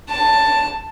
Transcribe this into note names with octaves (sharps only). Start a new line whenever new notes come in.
A5